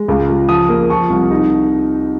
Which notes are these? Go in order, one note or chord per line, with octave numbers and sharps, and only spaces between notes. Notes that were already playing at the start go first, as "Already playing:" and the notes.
Already playing: G#3
C#2
C#2
F3 D#6
A#3
F3 C#6
C2
D#4